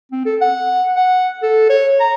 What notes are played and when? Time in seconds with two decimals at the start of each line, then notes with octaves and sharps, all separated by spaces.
0.12 C4
0.25 A4
0.41 F#5
0.96 F#5
1.43 A4
1.69 C#5
2.00 A#5